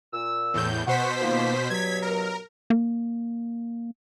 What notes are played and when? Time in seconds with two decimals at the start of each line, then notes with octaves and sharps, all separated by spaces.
0.13 A#2 E6
0.54 E2 A2 G6
0.87 B2 C5 F#5 C#6 B6
1.22 D#3 F3 A#3
1.70 G2 B2 F#3 G#6 B6
2.02 A#4
2.70 A#3